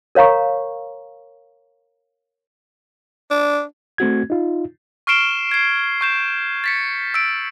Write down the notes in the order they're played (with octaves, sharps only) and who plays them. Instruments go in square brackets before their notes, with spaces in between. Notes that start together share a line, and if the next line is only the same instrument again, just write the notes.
[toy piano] A#4 C#5 F5 A#5 C#6
[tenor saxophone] D4
[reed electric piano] A3 C4 F#4 G#6
D#4 F4
[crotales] C#6 F6 C7 D7 E7 G7
G#6 C7
C#6 G6 E7
A6 B6 C#7
E6 D7